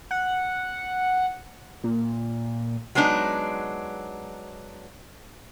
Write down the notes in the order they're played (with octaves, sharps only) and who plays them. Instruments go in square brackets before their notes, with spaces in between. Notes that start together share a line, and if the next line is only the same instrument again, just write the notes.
[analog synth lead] F#5
A#2
[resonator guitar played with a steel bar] F#3 G#3 B3 D4 D#4